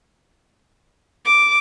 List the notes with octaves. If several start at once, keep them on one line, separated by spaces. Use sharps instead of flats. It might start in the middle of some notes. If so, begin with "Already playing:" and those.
D6